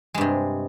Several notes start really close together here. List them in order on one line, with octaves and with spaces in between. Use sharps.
G#3 G2 C3